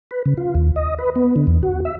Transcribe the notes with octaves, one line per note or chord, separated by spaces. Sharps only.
B4
C#3
F4
D#2
D#5
B4
B3
D3
E2
F#4
E5